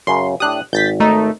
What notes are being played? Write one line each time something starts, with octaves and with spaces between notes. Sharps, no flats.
F#2 C#3 C6
A2 D4 G4 D#6 F#6
G#1 G6 A6 B6
A3 D#4